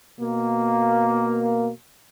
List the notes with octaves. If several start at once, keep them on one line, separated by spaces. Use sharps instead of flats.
B2 A#3